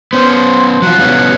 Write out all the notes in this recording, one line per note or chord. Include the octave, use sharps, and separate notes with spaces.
B3 C#4 C5
F#3 F4 F#5
G3 B3 C#4